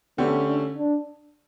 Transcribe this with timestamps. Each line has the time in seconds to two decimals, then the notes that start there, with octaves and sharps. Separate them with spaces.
0.18 D3 A3 B3 C#4 G4
0.47 D4
0.77 D4